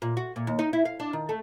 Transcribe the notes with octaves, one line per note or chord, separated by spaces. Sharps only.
A#2
F#4
A#2
D#2
D#4
E4
F5
D4
D#3
A3